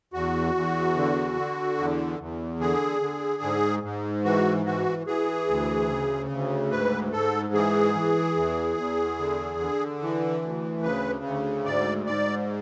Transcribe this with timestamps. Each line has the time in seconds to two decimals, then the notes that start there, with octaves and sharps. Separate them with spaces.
0.13 E2 F#4
0.55 E2
0.96 D3
1.36 D3
1.78 E2
2.19 E2
2.60 D3 G#4
3.02 D3
3.43 G#2
3.83 G#2
4.24 E3 F#4
4.66 E3 F#4
5.07 E3 G#4
5.48 D2
5.89 C#3
6.30 D2
6.71 G#2 B4
7.12 G#2 A4
7.54 E3 G#4
7.94 E3
8.36 E2
8.77 E2
9.18 D3
9.60 D3
10.01 E3
10.41 D2
10.83 C#3 B4
11.24 D2
11.65 G#2 D5
12.06 G#2 D5